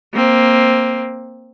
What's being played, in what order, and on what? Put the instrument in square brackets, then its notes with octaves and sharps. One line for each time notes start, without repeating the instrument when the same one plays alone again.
[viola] A#3 C4